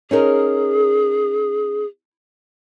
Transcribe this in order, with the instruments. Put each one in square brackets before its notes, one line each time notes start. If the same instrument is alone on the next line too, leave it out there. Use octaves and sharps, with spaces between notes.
[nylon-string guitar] C#4 D#4 A#4 [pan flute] G#4